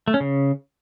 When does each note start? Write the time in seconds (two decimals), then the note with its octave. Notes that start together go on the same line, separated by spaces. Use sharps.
0.08 A3
0.14 C#4
0.20 C#3